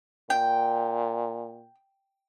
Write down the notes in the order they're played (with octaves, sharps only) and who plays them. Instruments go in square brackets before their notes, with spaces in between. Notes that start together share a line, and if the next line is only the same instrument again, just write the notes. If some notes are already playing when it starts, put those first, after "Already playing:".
[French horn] A#2 [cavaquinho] G5